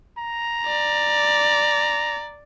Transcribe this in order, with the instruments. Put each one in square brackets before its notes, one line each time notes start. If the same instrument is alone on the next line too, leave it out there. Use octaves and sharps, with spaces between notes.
[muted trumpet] A#5
[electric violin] D5